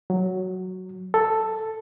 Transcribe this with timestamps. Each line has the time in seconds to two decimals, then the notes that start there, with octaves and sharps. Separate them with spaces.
0.10 F#3
1.14 A4